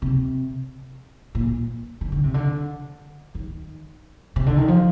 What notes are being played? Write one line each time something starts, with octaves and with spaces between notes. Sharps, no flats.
C3
A#2
D#3
D3
C3
D3
D#3
C3
D3
D#3
F3